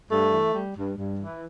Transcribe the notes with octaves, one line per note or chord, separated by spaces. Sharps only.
G2 A3
E3
G3
G2
G2
E3